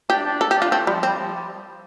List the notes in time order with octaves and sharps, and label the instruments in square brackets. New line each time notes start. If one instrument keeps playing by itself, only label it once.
[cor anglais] D4 [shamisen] G4
[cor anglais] D4
[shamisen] A4
G4
[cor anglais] D4 [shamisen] F4
[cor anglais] A3 [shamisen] C4
[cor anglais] F3 [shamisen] G3
[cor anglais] G3 [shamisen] C4
[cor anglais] F3
G3